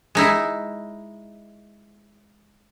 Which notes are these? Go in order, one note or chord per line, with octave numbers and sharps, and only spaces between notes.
G#3 D#4 E4